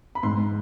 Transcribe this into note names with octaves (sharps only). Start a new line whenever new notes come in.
B5
G#2 C6